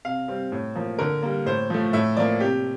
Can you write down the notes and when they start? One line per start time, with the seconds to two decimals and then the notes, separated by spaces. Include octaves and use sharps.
0.05 C3 F5
0.28 G3 C4
0.52 A2
0.75 F3 A#3
0.99 D3 A#4
1.23 G3 A#3
1.46 A2 C5
1.70 F3 A3
1.93 A2 E5
2.17 F3 A#3 D5
2.40 C3 G4